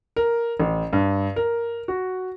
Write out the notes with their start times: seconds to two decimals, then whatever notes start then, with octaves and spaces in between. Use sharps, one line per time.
0.16 A#4
0.60 A1
0.93 G2
1.36 A#4
1.88 F#4